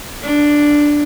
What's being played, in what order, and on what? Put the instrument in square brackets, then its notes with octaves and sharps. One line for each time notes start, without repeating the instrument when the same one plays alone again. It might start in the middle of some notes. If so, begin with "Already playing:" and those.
[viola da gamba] D4